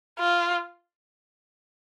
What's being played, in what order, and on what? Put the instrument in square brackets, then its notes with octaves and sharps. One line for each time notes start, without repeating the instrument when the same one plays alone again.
[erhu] F4